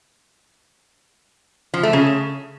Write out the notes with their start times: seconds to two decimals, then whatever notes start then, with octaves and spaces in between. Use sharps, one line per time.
1.74 F3
1.83 A3
1.93 C#3